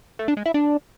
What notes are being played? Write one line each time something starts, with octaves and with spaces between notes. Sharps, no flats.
A3
D4
G#3
E4
D4